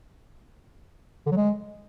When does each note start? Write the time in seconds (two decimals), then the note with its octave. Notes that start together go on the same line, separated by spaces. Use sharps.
1.26 D3
1.31 F#3
1.37 G#3